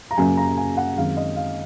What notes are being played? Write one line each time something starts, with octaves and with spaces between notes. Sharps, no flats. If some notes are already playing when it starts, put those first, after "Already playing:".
A#5
F#2 C#3 F#3 A#3 C#4 G#5
A#5
G#5
F#5
F#2 D#3 G#3 C4 F5
D#5
F5